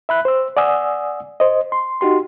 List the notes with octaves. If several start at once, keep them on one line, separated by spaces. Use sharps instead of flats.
E5 B5 F#6
C5 E6
D5 F#5 G#5 D#6 E6
C5 D#5
C6
D#4 F#4 G4 C6